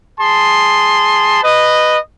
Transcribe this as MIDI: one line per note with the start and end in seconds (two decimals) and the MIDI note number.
0.20 1.43 68
0.20 1.43 81
0.20 1.43 84
1.43 1.98 71
1.43 1.98 75